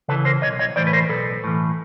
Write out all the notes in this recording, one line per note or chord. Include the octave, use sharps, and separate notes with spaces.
C#3 E3 A4 B4
A#4 C5
B1 C#5 D#5
C#5 D#5
A2 E3 C5 D5
B4
A#4 C5
B1 A4 B4
A2 E3